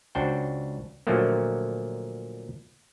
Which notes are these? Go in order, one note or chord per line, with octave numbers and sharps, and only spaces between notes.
C#2 D4 F#4 C5 G5
A#2 D3 F3 F#3 A3 A#3